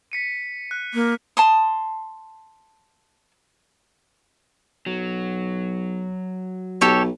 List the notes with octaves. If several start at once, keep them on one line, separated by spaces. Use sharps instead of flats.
B6 C#7 D#7
F#6
A#3
A5 C6 D#6
B1 F#3
B1 G4 A4 C#5